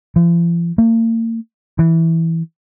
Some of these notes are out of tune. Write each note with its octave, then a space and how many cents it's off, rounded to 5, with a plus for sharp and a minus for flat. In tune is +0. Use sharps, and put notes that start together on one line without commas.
F3 -45
A#3 -40
E3 -5